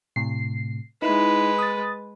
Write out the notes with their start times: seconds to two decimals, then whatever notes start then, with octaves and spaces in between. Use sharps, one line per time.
0.16 A2 C3 C7
1.02 G#3 D#4 E4 B4
1.58 D#6 A6